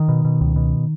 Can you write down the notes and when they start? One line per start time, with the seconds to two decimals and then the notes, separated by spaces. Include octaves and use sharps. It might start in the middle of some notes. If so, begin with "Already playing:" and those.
Already playing: D#3
0.09 B2
0.25 B2
0.41 C#2
0.56 B2